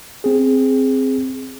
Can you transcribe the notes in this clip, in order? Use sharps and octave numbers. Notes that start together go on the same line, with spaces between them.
C4 G#4